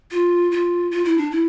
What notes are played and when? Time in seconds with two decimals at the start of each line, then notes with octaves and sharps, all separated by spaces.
0.11 F4
0.52 F4
0.91 F4
1.05 E4
1.18 D4
1.31 E4